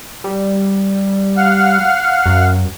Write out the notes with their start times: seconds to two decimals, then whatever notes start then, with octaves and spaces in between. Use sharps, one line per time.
0.24 G3
1.37 F5 F#5 F6
2.26 F#2